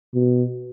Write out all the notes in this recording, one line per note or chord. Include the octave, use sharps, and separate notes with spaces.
B2